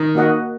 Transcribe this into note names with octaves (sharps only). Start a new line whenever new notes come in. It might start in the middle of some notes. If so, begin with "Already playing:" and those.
Already playing: D#3
A#3 F#4 D#5 F#5